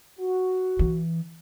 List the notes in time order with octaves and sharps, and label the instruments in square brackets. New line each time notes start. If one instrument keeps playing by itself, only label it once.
[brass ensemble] F#4
[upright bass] E3